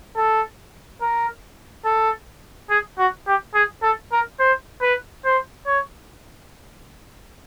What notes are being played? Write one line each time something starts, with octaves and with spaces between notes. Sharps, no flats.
A4
A#4
A4
G#4
F#4
G4
G#4
A4
A#4
C5
B4
C5
C#5